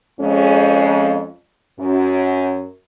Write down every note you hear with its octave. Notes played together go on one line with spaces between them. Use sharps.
F2 G#3 C#4
F#2